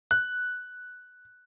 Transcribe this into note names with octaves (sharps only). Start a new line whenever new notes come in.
F#6